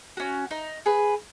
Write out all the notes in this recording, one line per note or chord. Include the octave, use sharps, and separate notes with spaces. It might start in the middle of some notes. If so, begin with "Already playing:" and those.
C#4 F#4
D#4
G#4 B4